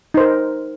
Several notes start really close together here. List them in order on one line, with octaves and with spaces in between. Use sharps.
D#4 C5 A#4